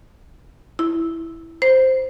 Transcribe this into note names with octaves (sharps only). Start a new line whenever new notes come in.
E4
C5